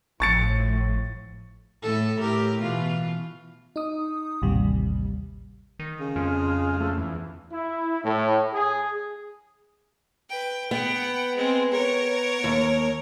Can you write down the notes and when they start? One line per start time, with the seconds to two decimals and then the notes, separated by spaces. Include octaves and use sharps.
0.20 G#1 A2 F3 C#6 A6 C#7
1.82 A2 A3 A4
2.19 A2 G4 A#4
2.62 B2 E3 F4
3.76 D#4 D#6
4.42 A1 D#2 C3 G3
5.79 D#3
6.00 C#3
6.16 F2 G#3 F4
6.80 F3 A3
6.98 E2
7.52 E4
8.04 A2
8.54 G#4
10.30 B4 G5
10.71 B3 F#5 G5
11.36 G#3 C4
11.71 A#4 C#5
12.44 D#2